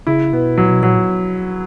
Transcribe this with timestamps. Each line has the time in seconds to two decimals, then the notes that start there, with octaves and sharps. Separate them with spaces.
0.07 C#3 E4
0.33 B2 B3
0.58 A#2 F#3
0.71 B2
0.83 A#2 F#3